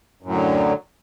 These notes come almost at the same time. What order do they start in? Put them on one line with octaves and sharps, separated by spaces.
F#2 A2 F#3 D3